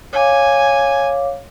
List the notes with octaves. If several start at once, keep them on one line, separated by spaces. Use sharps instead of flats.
C#5 F5 G#5 D6